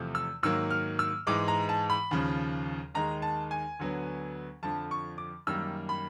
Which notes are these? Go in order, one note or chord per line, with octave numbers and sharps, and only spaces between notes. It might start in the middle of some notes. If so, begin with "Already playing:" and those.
Already playing: E2 C3 F3 A3
E6
G#2 D#3 F#3 A#3 E6
F6
E6
G#2 E3 G#3 D6
A#5
A5
B5
D#2 C#3 F3
D#2 D#3 G#3 A#5
A5
G#5
D2 D3 F#3 B3
F2 D3 F3 A5
C#6
D6
F#2 D#3 G3 A#3 E6
B5